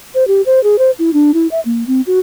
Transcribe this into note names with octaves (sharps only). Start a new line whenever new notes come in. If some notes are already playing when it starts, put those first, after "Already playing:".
C5
G4
C5
G#4
C5
E4
D4
E4
E5
A#3
C4
F#4